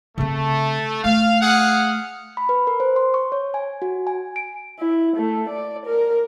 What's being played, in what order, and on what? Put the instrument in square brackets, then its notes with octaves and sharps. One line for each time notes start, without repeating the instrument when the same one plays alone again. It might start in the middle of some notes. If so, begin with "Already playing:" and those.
[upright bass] C#3 C4 [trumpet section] A3
[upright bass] A3 [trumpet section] F5
[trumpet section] G#4 F5 F#5
[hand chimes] B5
B4
A#4
C5
C6
C#6
C#5
G#5
F#4
G#5
D7
[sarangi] E4
A3
D5
A#4